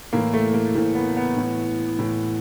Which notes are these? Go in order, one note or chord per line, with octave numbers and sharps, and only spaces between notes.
A2 E3 A#3
A3
A#3
A2 E3 A#3
B3
B3
A2 E3
A2 E3